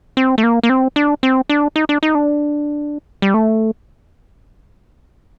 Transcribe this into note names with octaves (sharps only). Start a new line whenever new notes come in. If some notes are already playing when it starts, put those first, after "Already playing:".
C4
A3
A#3
A#3
C4
D4
C4
D4
D#4
D4
D#4
D4
G3
A3